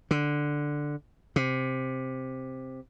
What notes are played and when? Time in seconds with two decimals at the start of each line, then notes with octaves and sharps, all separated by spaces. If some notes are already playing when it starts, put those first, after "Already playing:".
0.11 D3
1.36 C3